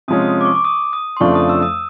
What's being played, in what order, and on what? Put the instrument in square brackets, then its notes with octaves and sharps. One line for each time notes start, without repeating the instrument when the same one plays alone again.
[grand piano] C3 F3 G#3 C#4 [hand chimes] D#6
[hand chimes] D#6
D6
C#6
D6
D#6
D#6
C6
[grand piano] F2 C#3 F3 A3 D4 [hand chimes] C#6
[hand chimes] D#6
E6
D#6